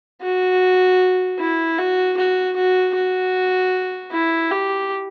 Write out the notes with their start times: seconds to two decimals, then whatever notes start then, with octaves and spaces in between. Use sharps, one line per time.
0.22 F#4
1.39 E4
1.78 F#4
2.17 F#4
2.56 F#4
2.95 F#4
4.12 E4
4.51 G4